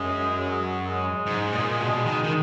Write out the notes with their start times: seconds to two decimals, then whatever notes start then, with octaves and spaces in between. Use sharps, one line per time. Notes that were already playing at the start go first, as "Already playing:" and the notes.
Already playing: F#2 G#3
0.37 G#3
0.47 F#3
0.87 G#3
1.26 G#2
1.52 A#2
1.79 B2
2.05 D#3
2.23 D#3